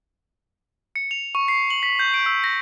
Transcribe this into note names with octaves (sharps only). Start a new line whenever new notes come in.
C#7
F7
C#6
C7
F#7
B6
G6
D7
E6
A#6